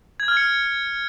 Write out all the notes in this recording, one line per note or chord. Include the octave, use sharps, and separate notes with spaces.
G#6
F6
C#7